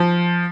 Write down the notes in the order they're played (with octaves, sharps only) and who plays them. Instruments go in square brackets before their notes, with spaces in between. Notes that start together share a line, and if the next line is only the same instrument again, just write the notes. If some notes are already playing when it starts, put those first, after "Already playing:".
Already playing: [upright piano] F3